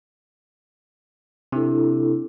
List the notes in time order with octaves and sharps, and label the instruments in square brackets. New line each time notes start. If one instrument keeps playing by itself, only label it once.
[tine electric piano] C3 [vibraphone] D4 E4 A4